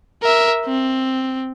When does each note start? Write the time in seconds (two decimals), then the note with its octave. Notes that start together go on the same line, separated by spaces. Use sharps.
0.23 A#4 E5
0.66 C4